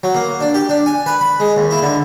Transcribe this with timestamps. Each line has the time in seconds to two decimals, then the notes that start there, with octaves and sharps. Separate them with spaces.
0.03 F#3
0.15 A#3
0.41 D4
0.54 G4
0.69 D4
0.86 G#5
1.06 B4
1.21 B5
1.40 G#3
1.56 D#2
1.71 E4
1.82 D3